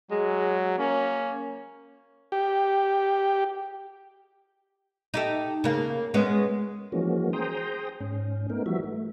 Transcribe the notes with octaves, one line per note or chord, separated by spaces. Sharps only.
F#3 G#3
A#3 C#4
G4
D#4 G4 A4
C#3 A#3
G#3 B3 C#4
E3 F3 G#3 A#3 C#4 F#4
G#4 C5 G5 A#5 C6 D#6
G#2 C#4
A3 B3 D#4 A#4
E3 F3 G3 F#4 E5
A3